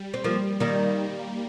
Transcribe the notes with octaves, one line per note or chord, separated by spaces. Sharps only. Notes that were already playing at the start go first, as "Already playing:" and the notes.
Already playing: G3
C4
F3 G3 A#3
D#3 G3 A#3